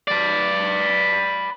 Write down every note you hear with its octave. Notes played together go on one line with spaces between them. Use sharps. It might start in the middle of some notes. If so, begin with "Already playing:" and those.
B4 D5